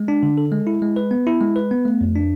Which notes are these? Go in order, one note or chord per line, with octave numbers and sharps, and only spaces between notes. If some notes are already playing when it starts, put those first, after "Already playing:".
Already playing: G#3
D4
D3
A4
G#3
E4
G#3
B4
B3
E4
G#3
B4
B3
A3
F2
D4